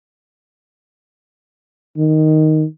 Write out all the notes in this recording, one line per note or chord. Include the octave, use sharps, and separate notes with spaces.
D#3